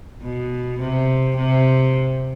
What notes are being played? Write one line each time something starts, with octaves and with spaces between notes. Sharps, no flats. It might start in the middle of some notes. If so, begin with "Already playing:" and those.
B2
C3
C3